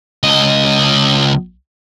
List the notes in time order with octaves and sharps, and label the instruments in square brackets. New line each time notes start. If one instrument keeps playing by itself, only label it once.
[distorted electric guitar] C#2 D#5